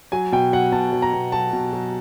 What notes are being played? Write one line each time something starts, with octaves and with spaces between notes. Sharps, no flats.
F#3 G#5
B2 G5
F#3 F#5
B2 A5
F#3
A#5
B2
F#3 A5
B2
F#3